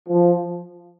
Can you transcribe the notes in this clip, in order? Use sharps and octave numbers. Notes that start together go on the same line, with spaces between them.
F3